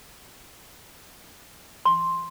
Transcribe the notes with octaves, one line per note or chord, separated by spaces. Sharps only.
C6